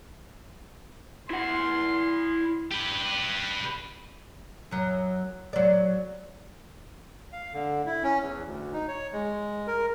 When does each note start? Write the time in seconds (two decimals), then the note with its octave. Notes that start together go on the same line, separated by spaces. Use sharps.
1.30 E4 F#5 C6
2.72 G4 B4
4.71 F#2 F#3
5.53 F#3 D5
7.33 F5
7.53 D3
7.86 E4
8.03 C#4
8.22 E2
8.45 D2
8.73 D#4
8.88 C#5
9.13 G#3
9.67 A#4